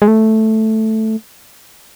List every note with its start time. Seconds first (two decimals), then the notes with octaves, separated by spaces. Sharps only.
0.02 G#3
0.08 A3